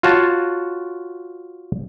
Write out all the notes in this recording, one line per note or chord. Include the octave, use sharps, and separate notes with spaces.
F4 F#4 C#5 A5